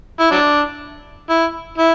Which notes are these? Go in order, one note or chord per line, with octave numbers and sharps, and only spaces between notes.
E4
F#3 D4
E4
E4